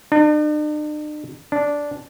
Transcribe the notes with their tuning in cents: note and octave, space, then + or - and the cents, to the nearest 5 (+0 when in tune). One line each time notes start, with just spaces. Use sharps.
D4 +45
D4 -10